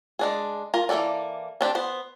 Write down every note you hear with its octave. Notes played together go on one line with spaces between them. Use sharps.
G#3 D4 G#4
F4 A#4
E3 A#3 G#4 A4 D5
C4 D4 G4
B3 C5